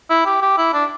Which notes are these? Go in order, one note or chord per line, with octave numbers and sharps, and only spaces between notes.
E4
G4
G4
E4
D4